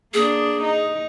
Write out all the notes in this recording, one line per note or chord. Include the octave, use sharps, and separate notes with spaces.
A#3 D4 G#4
D#4